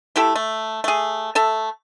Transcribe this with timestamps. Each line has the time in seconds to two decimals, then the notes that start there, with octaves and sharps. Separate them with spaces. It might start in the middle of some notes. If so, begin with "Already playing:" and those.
0.16 A3 E4 G4 A4
0.36 A3
0.84 A3 G#4
1.35 A3 A4 E5